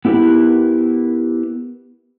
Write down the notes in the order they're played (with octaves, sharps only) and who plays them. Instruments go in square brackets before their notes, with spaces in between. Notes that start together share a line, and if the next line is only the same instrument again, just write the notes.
[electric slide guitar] B3 E4 G4 A#4 B4